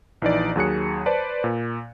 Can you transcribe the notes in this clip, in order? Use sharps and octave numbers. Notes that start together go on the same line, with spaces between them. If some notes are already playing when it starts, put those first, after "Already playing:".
A#1 E3 D#4 D5
D#2 F#3 G#4 F#6 C#7
B4 C5 D5 A5
A#2